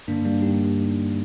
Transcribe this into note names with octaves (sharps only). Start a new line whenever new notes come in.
G2 D3 A#3 D4
G3 A#3
D#4 G4